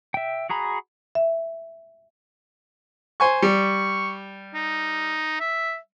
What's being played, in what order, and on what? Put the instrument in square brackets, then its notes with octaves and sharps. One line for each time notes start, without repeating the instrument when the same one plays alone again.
[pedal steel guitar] E5 G5
F#4 G#4 A#5 B5
[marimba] E5
[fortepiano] C5 G#5 C#6
[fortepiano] G3 [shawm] C#6
[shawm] D#4
E5